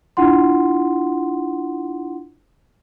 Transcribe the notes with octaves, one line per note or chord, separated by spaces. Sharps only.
D4 E4 F4 F#5 C6